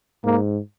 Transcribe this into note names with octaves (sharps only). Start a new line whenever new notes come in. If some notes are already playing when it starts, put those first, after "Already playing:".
G#2 A#3